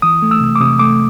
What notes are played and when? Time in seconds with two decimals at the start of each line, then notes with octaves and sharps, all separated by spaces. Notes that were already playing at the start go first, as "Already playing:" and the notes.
0.02 E3 D#6
0.22 A3
0.31 E6
0.41 C3
0.55 D6
0.60 C3 D#6
0.79 A3 D6